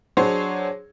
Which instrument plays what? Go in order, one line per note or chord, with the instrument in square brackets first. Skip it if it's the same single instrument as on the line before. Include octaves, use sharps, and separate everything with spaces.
[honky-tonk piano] F#3 D4 G#4 C5 C#5